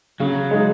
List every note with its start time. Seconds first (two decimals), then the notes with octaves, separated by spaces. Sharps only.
0.20 C#3 F#3
0.51 G#3 D#4